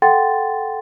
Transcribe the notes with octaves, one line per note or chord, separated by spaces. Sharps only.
A4 F#5 G5 C6 A6